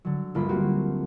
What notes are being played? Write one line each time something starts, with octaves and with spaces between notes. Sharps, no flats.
D3 F#3
G1 D2 A#3 F4 B5
A#3 C4 F#4 G4